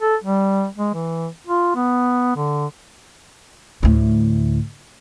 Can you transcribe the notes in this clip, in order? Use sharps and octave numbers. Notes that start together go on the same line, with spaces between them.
A4
G3
G#3
E3
F4
B3
D3
D2 A2